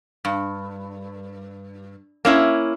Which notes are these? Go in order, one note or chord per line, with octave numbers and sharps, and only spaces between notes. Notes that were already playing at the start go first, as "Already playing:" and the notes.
G2
A#3 C#4 E4